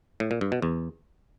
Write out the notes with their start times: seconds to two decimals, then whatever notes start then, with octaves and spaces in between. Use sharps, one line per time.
0.20 A2
0.31 A#2
0.41 G2
0.52 B2
0.62 E2